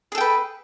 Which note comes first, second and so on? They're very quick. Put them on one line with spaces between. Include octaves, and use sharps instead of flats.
G#4 A4 G5 B4